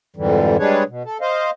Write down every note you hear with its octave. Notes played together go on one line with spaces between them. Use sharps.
F2 G#2 D3 E3 G3
G3 G#3 D4 G#4 B4 C#5
B2
A4
C5 D#5 F5